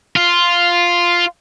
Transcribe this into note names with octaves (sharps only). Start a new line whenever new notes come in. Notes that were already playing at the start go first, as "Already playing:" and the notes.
F4